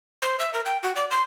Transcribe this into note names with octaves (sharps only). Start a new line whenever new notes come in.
C5
E5
A#4
G5
F#4
D5
C6